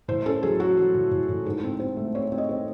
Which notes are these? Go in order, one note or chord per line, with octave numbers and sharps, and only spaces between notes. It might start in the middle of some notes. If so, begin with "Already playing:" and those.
A2 C5
C#4 A4
F#3 G#4
F#3 F#4
F#3
A2
A2
A2
G#2 A4
C4
C4 C5
A3
C4 C#5
C4
D#5
C4